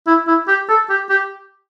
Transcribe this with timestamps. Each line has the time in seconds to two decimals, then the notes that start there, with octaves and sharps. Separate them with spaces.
0.07 E4
0.27 E4
0.48 G4
0.69 A4
0.90 G4
1.10 G4